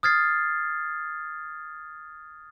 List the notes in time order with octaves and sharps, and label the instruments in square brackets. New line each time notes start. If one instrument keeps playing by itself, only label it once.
[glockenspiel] D#6 F6 G#6 A6 C7